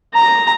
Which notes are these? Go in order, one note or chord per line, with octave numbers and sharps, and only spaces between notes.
A#5